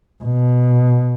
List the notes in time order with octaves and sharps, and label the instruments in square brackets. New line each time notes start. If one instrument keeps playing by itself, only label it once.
[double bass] B2